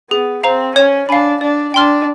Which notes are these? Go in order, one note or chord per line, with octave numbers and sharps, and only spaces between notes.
B3 G#4
C4 C5 F5 A#5
C#4 C#5
D4 F5 G#5 B5
D4 D5
D4 G5 C6 F6